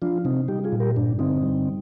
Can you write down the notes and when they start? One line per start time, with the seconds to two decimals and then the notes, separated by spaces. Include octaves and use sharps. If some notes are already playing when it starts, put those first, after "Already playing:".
0.02 F3 D4 F4
0.25 C3 C4 D#4
0.48 G3 D#4 G4
0.64 F4 G#4
0.72 A#2
0.80 G4 A#4
0.96 G2 D4
1.19 D3 C4 D#4
1.42 G3